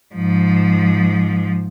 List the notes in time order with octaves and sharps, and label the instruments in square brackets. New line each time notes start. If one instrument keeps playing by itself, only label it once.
[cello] G#2 F3